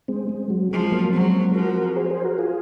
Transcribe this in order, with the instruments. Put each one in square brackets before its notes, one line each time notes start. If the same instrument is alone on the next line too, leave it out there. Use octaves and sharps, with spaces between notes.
[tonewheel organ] G#3 C4
G#3
F#3
[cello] F3 [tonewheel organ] G#3
[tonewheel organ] F#3 A#3
[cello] F#3 [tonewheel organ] G#3 C4
[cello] F3 [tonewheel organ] F#4 A#4
[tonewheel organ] G#4 C5
G#4 C5
F#4 A#4
F4 G#4